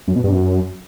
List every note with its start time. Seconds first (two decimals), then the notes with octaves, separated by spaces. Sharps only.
0.08 F#2
0.16 B2
0.24 G2
0.32 F#2